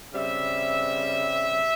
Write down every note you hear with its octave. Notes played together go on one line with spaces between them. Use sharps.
C#3 G3 C4 E5